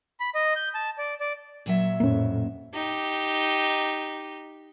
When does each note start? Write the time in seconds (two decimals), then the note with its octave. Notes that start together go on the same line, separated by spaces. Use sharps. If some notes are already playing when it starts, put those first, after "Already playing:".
0.20 B5
0.35 D#5
0.56 G6
0.75 A5
0.98 D5
1.21 D5
1.66 A#2 F#3 E5
2.00 F2 A2 A#3 C#4
2.74 D#4 G4